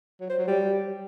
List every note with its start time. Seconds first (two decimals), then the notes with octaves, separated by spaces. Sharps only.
0.21 F#3
0.29 C5
0.38 F#3
0.47 G3